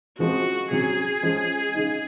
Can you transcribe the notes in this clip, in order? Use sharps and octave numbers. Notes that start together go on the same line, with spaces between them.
C#3 F3 G#3 C4 F#4
C3 F#3 C#4 G#4
F3 G#3 C#4
C#3 G#3 D#4